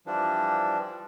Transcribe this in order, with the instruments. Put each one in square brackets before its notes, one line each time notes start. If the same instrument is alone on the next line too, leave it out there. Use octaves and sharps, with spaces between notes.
[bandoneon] E3 F3 G3 D4